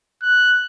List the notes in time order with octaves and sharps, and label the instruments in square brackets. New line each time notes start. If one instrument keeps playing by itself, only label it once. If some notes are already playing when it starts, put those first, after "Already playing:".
[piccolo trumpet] F#6